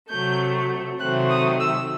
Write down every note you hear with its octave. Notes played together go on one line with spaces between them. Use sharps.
C3 F#3 A3 G6
C3 D#3 F#3 A3 C4 F#6
D#6
E6